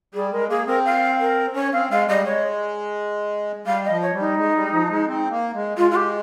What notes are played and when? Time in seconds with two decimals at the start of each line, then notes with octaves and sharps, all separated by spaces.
0.14 G3 G#4
0.31 G#3 A#4
0.49 A#3 G#4
0.66 C4 A#4
0.85 F5
1.20 A#4
1.54 C#4 C#5
1.72 C4 F5
1.90 G#3 F5
2.07 G3 D#5
2.25 G#3 C#5
3.66 G3 F5
3.84 D#5
3.90 F3
4.02 C#5
4.14 G3
4.19 D#4
4.37 G#3
4.54 G3
4.72 F3
4.90 G#3
5.07 C4
5.30 A#3
5.54 G#3
5.77 G#3 F4
5.90 F4
5.95 G4